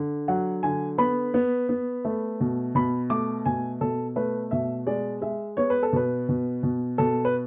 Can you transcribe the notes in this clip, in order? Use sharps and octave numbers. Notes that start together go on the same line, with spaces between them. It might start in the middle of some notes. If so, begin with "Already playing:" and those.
Already playing: D3
F#3 F#5
D3 G#5
B3 B5
B3
B3
A3
B2
B2 B5
A3 D6
B2 G#5
B2 A4
A3 B4
B2 E5
G#3 D5
G#3 E5
B3 C#5
B4
A4
B2 B4
B2
B2
B2 A4
B4